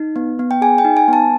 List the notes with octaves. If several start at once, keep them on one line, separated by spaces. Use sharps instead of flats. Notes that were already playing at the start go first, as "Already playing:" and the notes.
Already playing: D#4
B3
B3
G5
G#4 G#5
G5
D#4
G#5
B3 A5